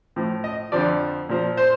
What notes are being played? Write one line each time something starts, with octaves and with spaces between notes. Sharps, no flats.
A2 F3
D#5
F2 D3 F3 D5
A#2 F3
C5